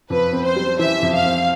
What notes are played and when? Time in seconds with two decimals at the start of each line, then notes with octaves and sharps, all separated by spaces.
0.10 F2 B4
0.33 C4
0.44 C5
0.56 G3
0.79 E3 E5
1.03 F2
1.13 F5
1.25 C4